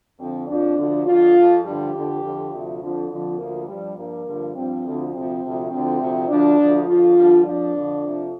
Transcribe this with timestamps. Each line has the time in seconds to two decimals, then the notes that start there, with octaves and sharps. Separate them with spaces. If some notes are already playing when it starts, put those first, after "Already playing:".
0.18 F2 D3 F3 C4
0.47 F2 F3 D4
0.76 D2 D3 F3
1.04 F2 D3 F3 F4
1.34 F2 F3
1.62 G2 D3 F3 G4
1.92 F2 D3 F3
2.21 F2 D3 F3
2.50 D2 C3 F3
2.79 F2 D3 F3
3.08 F2 D3 F3
3.37 D2 D3 F3 A#3
3.66 G2 F3 G3
3.95 G2 F3 A#3
4.24 G2 D3 F3
4.53 G2 F3 C4
4.82 D2 D3 F3
5.11 D2 C3 F3 C4
5.40 D2 C3 F3
5.69 D2 D3 F3 C4
5.98 D2 C3 F3
6.27 D2 D3 F3 D4
6.56 D2 D3 F3
6.86 F2 D3 F3 F4
7.14 G2 D3 F3
7.43 F2 F3 D4
7.73 F2 D3 F3
8.01 F2 C3 F3